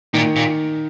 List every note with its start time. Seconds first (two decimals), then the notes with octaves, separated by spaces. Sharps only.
0.14 A#2 D#3
0.36 A#2